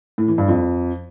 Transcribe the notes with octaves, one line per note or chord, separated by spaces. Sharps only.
A2
E3
G2
F2